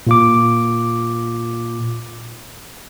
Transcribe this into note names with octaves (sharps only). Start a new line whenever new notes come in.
A#2 F4 D6